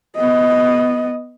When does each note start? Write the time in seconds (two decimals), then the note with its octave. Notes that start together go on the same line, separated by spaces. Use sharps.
0.16 B3 D#5